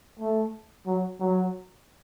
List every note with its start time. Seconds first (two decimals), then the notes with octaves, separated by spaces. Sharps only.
0.19 A3
0.86 F#3
1.20 F#3